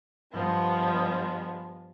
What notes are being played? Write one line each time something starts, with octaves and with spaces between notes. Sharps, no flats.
G2 F3 G#3 B3